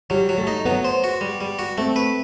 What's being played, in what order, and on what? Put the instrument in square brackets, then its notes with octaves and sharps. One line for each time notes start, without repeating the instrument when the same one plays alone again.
[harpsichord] F#3 [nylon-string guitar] G3
[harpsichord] F#3
[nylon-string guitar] A3
[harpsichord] D#4
[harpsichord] F#3 [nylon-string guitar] B3
[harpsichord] C5
F#4
G3
G3
F#4
[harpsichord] A3 [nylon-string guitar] C4
[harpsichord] B4